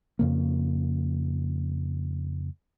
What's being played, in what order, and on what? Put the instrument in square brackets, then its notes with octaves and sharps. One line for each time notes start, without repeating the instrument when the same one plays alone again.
[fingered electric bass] F2 C#3 A#3